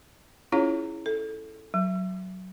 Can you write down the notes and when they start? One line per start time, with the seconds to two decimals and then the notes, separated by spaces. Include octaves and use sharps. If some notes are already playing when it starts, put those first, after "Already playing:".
0.52 C#4 E4 F4 G#4 C#5 F5
1.06 A4
1.74 F#3